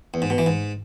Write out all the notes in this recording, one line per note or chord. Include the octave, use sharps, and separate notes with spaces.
E2
G#2
B2
E3
G#2